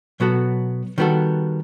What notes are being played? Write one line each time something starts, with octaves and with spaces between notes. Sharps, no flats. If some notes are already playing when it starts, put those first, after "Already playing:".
B2 F#3 B3 F#4 A4
D#3 G3 B3 F#4 A4